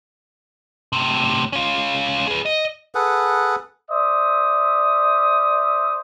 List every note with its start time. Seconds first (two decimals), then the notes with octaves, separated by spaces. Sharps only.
0.93 A2 C3
1.53 C#4 F4
2.28 G#4 B4
2.46 D#5
2.95 G#4 A4 B4 F#5
3.89 C5 D5 E5 D#6